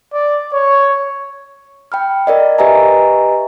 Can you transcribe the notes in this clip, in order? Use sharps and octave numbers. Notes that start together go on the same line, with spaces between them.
D5
C#5
G5 B5 F6
A#4 D5 D#5
G4 B4 D#5 E5 G#5 A#5